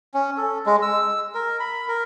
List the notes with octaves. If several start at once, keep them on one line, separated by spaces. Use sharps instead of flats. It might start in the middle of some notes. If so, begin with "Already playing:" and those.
C#4
A4
G#3
E6
A#4
B5
A#4